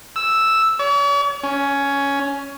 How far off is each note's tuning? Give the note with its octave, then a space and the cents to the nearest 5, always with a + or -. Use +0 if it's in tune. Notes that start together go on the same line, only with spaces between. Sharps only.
E6 +0
C#5 +45
C#4 +10